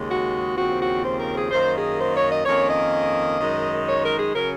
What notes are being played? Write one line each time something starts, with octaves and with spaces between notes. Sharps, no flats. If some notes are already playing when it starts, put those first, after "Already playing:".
Already playing: D#2 C#3 G#3
F#4
D#2 C#3 F3 C4 F#4
F#4
C5
A#4
G#4
F#2 D#3 A#3 C5
G#4
C5
C#5
D#5
F2 D#3 A#3 C#4 C#5
D#5
F#2 D#3 G#3 D#4
C#5
A#4
G#4
C#3 F#3 C#4 A#4